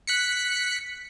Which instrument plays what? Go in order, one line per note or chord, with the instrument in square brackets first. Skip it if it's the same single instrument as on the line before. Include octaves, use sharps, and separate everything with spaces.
[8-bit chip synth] F#6 B6 C#7